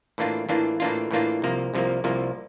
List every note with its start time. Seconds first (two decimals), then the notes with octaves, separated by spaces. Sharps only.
0.18 A2 E3 A#3 D4 F4
0.49 A2 E3 A#3 D4 F4
0.80 A2 E3 A#3 D4 F4
1.11 A2 E3 A#3 D4 F4
1.42 C2 C3 F3 A#3
1.74 C2 C3 F3 A#3
2.04 C2 C3 F3 A#3